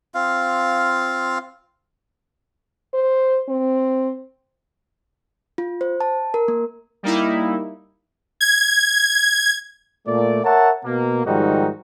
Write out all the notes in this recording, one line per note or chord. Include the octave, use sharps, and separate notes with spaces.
C4 F4 F5
C5
C4
F4
C5
A5
A#4
A#3
G3 A#3 D#4 E4
G#6
A#2 A3 D5
A#4 C#5 E5 F#5 A5
B2 A#3
G#2 D#3 F3 G3 D#4 F#4